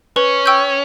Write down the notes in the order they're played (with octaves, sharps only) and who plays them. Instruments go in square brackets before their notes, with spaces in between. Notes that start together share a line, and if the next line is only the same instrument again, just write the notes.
[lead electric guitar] C#4 [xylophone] B4
[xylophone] G5 C#6 E6 G6